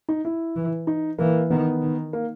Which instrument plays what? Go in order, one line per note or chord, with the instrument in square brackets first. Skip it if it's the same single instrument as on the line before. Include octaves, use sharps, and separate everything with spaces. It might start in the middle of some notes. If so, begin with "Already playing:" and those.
[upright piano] D#4
E4
[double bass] E3
[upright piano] D#4
[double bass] E3 [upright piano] A#3
[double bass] D#3 [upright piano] B3
[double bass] D#3
[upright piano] A#3